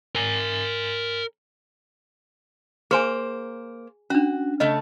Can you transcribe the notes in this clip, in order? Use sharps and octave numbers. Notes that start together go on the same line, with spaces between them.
A#4 G#5
A#3 G#4 C5 G#5
C#4 D4 F#4
C#3 A3 A4 D#5